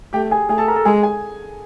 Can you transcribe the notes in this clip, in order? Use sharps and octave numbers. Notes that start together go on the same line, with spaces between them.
A3 G4 G5
G#4 G#5
A3 G#4 G#5
A4 A5
A#4 A#5
A4 A5
G#3 G#4 G#5
G#4 G#5